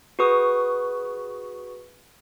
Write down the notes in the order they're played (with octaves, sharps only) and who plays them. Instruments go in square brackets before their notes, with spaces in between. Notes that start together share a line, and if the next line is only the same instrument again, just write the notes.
[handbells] F#4 G#4 B4 C#6 D#6